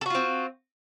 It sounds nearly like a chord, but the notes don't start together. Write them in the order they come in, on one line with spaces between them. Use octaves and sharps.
A4 F#4 F4 C4